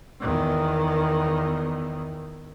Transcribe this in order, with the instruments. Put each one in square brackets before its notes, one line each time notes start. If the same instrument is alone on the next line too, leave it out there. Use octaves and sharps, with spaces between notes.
[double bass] E2 D#3